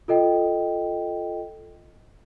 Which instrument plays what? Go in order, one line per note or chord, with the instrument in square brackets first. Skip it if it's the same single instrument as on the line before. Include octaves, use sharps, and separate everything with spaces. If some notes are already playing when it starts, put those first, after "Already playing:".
[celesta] F4 A4 D#5 G5